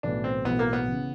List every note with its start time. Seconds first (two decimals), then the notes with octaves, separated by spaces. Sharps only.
0.03 B1 A2 E3 D4
0.24 C4
0.45 B1 A2 E3 B3
0.59 A#3
0.73 B3
0.87 C#3 E3